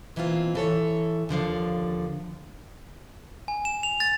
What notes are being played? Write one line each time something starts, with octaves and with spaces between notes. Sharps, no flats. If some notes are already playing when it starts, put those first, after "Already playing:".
B2 E3 A#3 C4 F4
E3 A4 C#5
D#2 D3 F3 F5
G#5
E7
F7
A6